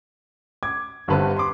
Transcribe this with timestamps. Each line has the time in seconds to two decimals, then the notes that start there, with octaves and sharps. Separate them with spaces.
0.63 D6 G#6
1.08 G1 G2 D3 C4 B4 A5
1.37 C6 D6